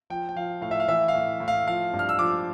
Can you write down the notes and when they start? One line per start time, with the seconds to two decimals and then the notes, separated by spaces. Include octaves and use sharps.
0.10 F3 G5
0.29 G5
0.36 F3 F5
0.62 A2 F5
0.71 E5
0.80 F5
0.88 E3 E5
1.08 F5
1.14 A2
1.40 A2
1.48 F5
1.67 F3 F5
1.93 G2
1.99 F6
2.09 E6
2.19 F3 D6